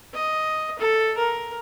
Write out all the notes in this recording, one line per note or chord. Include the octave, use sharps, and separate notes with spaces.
D#5
A4
A#4